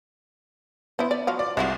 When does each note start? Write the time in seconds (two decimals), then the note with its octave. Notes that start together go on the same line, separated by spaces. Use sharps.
0.99 B3 E4 C5
1.11 D5
1.27 F3 F#3 F5
1.39 D5
1.57 C2 G#3 E4 F#4